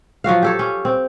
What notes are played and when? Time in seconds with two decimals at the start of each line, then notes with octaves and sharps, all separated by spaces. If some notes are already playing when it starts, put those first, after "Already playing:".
0.24 F3 F#3 F#4 F5
0.43 G4 A4 C#5
0.59 C#4
0.85 C4